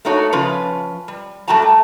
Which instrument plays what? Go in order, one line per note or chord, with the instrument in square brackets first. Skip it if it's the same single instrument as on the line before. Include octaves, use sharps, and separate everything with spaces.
[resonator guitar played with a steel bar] A3 A#3 D#4 F#4 C#5
C#3 F3 C#4 F4 B4
G3
G3 A3 F#4 G5 A5 A#5
A3